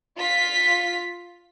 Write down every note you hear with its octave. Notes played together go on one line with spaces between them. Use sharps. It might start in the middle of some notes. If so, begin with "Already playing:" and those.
F4 B6